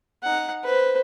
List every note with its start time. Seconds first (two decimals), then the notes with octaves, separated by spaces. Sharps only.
0.23 D#4 F#5
0.64 B4 C5